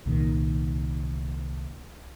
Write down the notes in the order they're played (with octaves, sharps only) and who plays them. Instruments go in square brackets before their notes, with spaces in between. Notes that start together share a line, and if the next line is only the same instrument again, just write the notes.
[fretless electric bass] C2 A#2 D#3